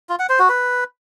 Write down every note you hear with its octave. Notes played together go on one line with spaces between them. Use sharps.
F4
F#5
C5
F#4
B4